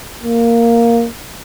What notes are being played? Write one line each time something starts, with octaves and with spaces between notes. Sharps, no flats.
A#3